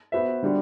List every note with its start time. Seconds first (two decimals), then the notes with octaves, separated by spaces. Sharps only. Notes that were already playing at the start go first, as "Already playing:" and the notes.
0.12 B3 F#4 C5 E5
0.43 D3 G3 D4 F#4